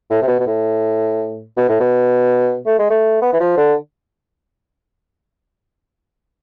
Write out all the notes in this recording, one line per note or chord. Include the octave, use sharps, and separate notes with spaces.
A2
C3
B2
B2
A2
B2
A2
B2
A3
G#3
A3
B3
E3
F3
D3